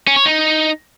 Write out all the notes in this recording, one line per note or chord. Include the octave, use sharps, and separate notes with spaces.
C#4
C#5
D#4